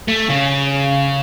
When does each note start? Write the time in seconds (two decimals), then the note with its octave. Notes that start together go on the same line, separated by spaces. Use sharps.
0.08 A3
0.29 C#3